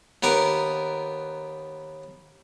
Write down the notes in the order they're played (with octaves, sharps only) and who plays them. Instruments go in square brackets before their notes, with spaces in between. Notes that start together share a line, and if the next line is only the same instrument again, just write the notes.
[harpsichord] D#2 B3 A#4 D6